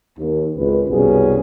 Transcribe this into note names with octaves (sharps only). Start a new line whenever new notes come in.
D#2
G#1 C#2 B4
C2 F#2 B2 B3 C#4 G#4